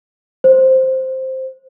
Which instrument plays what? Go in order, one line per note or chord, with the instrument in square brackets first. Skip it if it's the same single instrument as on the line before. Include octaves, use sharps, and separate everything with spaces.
[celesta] C5